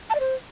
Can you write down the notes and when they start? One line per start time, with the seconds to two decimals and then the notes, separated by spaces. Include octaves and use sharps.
0.10 A5
0.15 D5
0.20 C5